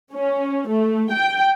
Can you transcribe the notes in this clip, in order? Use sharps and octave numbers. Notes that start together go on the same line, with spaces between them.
C#4
A3
G5